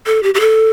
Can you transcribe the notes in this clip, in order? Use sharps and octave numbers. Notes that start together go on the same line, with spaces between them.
A4
G4
G4
A4